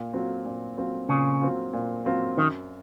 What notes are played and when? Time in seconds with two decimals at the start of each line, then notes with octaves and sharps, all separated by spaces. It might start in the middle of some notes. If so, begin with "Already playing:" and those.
Already playing: A#2
0.13 F#3 C4 F4
0.45 A#2
0.77 F#3 C4 F4
1.09 A#2 C#3
1.41 F#3 C4 F4
1.73 A#2
2.05 F#3 C4 F4
2.37 F#2 D#3